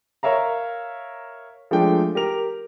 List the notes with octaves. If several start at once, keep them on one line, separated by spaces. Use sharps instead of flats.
A#4 C#5 E5 F5 A#5
F3 G#3 A3 D4 G5
G4 A#4 F7